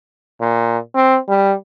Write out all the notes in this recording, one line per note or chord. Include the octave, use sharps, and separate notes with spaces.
A#2
C4
G3